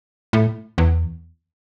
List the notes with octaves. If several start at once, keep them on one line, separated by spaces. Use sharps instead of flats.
A2
E2